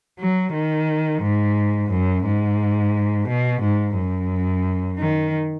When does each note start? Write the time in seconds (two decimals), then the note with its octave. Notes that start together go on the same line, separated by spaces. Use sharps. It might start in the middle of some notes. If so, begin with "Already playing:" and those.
0.19 F#3
0.53 D#3
1.22 G#2
1.90 F#2
2.25 G#2
3.28 B2
3.61 G#2
3.96 F#2
4.98 D#3